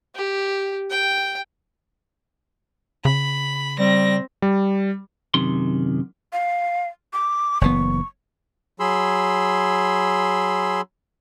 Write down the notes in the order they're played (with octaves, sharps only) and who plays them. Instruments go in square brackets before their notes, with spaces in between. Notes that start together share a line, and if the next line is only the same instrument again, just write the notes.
[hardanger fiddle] G4
G5
[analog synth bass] C#3 [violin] B5
[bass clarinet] G3 [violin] C4 A#6
[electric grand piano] G3
[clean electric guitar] F#2 C3 D#3 C6
[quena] F5
D6
[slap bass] F#1 E3 B3 [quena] C#6
[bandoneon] F#3 G#4 B5 C6 E6